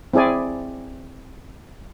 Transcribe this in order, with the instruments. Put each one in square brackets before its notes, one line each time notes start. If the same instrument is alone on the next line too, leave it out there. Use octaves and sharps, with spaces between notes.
[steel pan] C4 E4 G#4 D5 G#5